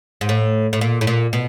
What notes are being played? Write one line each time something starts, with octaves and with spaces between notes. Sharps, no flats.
G#2
A2
A2
A#2
A2
A#2
B2